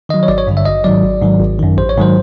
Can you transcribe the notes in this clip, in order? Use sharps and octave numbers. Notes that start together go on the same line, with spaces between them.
D#3 F#3 D#5
C#5
G#1 D5
C#5
G2 D3
E5
G#1 D#5
G#2 D#3 F#3 D5
G#1
G#2 D#3 F#3
G#1
F#2 D#3
A1 C5
C#5
G#2 D#3 F#3 C5